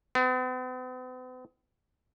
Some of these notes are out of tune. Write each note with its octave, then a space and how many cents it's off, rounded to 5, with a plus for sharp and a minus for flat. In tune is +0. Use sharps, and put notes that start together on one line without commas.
B3 +45